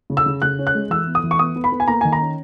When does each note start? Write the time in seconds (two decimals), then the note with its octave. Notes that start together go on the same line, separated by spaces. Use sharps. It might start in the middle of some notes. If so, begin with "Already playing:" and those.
0.10 C#3
0.17 E6
0.26 C#3
0.42 C#3 F#6
0.59 C#4
0.67 F#6
0.75 G#3
0.90 E3 E6
1.07 B3
1.15 D#6
1.24 E3
1.31 C#6
1.39 B3 D#6
1.56 B3
1.64 B5
1.72 B3
1.80 G#5
1.88 A#3 A#5
2.01 D#3 G#5
2.13 A#5
2.21 C#4